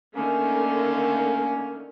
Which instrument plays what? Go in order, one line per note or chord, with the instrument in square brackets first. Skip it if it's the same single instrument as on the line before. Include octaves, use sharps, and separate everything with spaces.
[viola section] D3 D#3 A3 [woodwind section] A#3 C#4